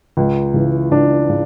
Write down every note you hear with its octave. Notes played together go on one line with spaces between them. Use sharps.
C#2
C#3 E3
C#2 D4
C#3